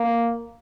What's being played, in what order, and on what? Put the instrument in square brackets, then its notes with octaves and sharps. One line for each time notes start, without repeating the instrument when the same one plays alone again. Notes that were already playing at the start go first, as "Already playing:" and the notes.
Already playing: [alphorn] A#3